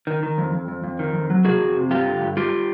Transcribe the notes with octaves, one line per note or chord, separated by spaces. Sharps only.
D#3
D#3
F2
F2
F2
F2
D#3
F2
F#3
C3 F#4 G#4
F2
C3
G2 F4 G4
D3
G2
G3 F4 G4